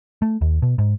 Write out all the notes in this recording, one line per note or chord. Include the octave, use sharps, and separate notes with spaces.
A3
D#2
B2
G#2